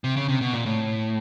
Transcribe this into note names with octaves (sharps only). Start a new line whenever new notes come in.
C3
C#3
C3
B2
A#2
A2